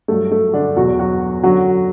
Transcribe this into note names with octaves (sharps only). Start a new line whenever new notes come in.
G2 F#3 A3
A3
D3 D4
E2 B2 F#3 F#4
F#3 F#4
F#2 D3 F#3 F#4